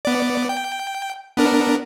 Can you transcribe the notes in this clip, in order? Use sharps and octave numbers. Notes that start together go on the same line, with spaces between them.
B3 D5
G5
B3 D4 A#4